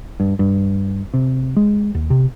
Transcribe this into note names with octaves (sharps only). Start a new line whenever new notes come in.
G2
G2
C3
G#3
D#2
C3